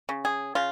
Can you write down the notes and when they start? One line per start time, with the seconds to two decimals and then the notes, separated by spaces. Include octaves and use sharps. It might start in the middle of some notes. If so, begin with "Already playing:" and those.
0.09 C#3
0.25 G#4
0.55 C#3 F4